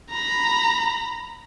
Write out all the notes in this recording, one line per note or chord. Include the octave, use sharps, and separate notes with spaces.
A#5 B5